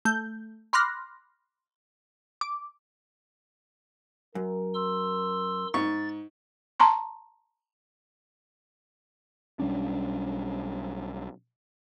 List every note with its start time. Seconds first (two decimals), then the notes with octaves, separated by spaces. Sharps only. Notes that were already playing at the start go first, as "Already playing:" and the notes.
0.05 A3 G6
0.73 B5 C6 D6 F6 F#6 A#6
2.41 D6
4.35 F#2 A#4
4.74 C6 E6
5.74 G#2 C#6 A6
6.80 A5 A#5 C6 C#6
9.59 B1 G3 C#4 D4